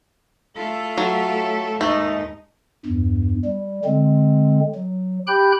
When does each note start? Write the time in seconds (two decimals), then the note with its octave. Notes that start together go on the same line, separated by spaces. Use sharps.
0.56 A3 E4 F4 A4
0.97 F#3 A4
1.81 D#2 G#2 A3 D#4
2.86 E2 G2
3.45 G3
3.85 D3 G#3 C4
4.75 F#3
5.27 G4 G5 B5 F#6 G6